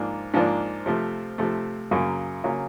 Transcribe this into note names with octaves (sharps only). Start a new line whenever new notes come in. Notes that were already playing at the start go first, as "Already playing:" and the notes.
Already playing: G#2 F3 A#3 D4
G#2 F3 A#3 D4
C3 F3 A3
C3 F3 A3
F#2 C#3 F#3 A#3
C#3 F#3 A#3